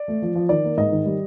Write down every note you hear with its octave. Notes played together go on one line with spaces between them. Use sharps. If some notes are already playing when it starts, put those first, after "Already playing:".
Already playing: D5
A3
F3
F3
D#3 D5
A#3
G#2 D#5
D#3
G3